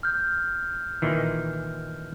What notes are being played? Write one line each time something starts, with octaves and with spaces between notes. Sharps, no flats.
F6 G6
A#2 D#3 E3